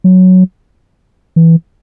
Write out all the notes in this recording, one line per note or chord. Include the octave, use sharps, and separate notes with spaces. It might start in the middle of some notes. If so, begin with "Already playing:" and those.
F#3
E3